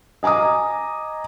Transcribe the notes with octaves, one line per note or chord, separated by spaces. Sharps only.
D#5 G#5 A#5 D6 D#6